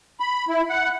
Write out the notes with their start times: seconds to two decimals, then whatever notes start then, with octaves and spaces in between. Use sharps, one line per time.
0.20 B5
0.48 E4
0.70 F#5